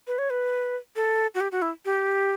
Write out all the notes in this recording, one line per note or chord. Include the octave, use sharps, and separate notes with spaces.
B4
C#5
B4
A4
F#4
G4
F#4
E4
G4